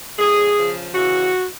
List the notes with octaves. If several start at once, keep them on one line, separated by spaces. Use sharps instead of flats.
A2 F#3 G#4
C#3 F3
C#3 E3 F#4